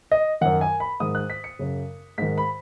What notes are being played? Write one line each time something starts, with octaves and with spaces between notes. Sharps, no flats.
D#5
F#2 D#3 F#5
G#5
B5
G#2 D#3 D#6
F#6
B6
C#7
F#2 C#3
G#2 D#3 B6
B5